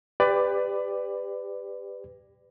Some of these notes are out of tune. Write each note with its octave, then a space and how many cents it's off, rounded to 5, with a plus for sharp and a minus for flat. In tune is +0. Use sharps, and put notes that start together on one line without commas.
G4 +25 B4 +25 D5 +5